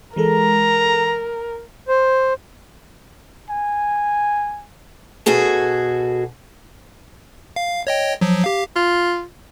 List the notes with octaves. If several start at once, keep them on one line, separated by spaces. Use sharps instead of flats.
E3 G#3 A4 A#4 A#5
C5
G#5
B2 F#4 G#4 A4
F5
C#5 D#5 G5
F3 F#3
G4 F5
F4